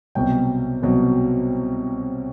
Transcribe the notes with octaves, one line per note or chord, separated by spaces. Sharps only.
C2 B2 F#3 G5
C2 B2 F#3